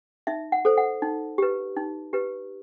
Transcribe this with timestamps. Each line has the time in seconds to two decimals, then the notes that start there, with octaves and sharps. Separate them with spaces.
0.27 D#4 E5
0.52 F#5
0.65 A4 C5
0.77 F#5
1.02 D#4
1.38 G4 B4
1.76 D#4
2.13 G4 B4